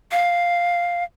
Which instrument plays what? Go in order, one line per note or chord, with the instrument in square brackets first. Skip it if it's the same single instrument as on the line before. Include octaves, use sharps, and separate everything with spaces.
[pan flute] F5